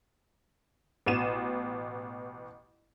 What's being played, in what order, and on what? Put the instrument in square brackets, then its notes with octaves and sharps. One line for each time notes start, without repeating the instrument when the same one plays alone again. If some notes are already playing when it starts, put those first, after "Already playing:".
[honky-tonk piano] A1 B2 D#7 E7